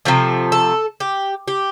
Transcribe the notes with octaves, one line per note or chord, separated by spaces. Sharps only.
C3 F3 A3
A4
G4
G4